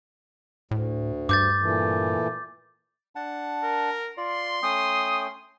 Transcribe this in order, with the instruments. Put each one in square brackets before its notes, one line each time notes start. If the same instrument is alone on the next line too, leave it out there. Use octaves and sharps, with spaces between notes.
[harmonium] D2 [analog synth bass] A2
[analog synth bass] G2 [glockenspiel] D6 G6 A6
[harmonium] A#2 E3 A3
[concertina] D4 F#5 A5
[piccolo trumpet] A#4
[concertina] F4 D5 [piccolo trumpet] C6
[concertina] A3 C#4 G5 [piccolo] D#6